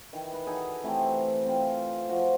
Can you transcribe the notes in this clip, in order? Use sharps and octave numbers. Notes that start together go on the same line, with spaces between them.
D#3 E3
B4
D#4 F#4 G#4 A4
C3 E3 A3 C4
C4 F4
F3 F#4